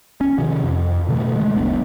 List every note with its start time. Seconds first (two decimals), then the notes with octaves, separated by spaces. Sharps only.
0.21 C#4
0.39 C3 D#3 F3
0.64 F2
1.09 B2 D3 E3 A3
1.36 G#3 A3
1.55 F#1 D2 B3 D4